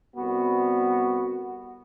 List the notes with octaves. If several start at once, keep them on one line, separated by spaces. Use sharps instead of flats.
C2 B3 F#4